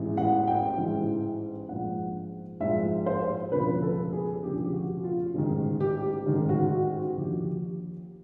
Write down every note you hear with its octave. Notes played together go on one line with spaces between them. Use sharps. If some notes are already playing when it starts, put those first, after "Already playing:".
Already playing: A1 G#2 E3
F#5
G5
A1 G#2 E3
A#1 G#2 F3 F#5
A#1 G#2 F3 E5
C5
E1 D2 C#3 F3 B4
A4
G#4
E1 D2 C#3 F3 G4
F#4
F4
A1 G#2 D#3
G4
A1 G#2 D#3
F#4
F#4
F#4
D#2 D3 F3 G4